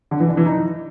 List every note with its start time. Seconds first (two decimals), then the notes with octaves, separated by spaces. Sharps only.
0.11 D3
0.20 E3
0.29 D4
0.37 E3
0.46 D#4